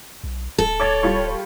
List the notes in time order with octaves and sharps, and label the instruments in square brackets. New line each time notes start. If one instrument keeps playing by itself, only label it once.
[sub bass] B1
[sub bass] D1 [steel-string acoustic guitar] A4
[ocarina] C#5 [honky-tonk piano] D6 G#6 A6
[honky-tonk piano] G3 F4 C#6